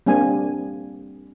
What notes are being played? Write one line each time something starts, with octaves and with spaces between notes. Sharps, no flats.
G3 A#3 C4 D4 G#5